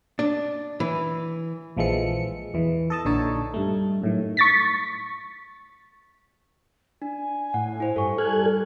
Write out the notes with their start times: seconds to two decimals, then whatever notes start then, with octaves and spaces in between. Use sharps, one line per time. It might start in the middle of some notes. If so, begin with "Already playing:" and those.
0.19 D4
0.80 E3
1.77 A#1 E3 F3 G#3 A4 C#7
2.54 E2 E3
2.90 A4 D#5 A5
3.05 A#1 D3 D#4 C#5 A5
3.54 G2 A3
4.01 F#2 A2 D#3
4.37 C#6 A6 B6
7.02 D4 G#5
7.54 A2 F#5
7.80 E4 C5
7.96 G2 A4 C#6
8.18 G3 A4 G#5 F6 F#6 G#6